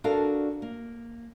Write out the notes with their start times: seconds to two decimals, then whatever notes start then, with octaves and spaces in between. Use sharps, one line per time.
0.04 D4 F#4 A4 A#4 D5 F5
0.62 A#3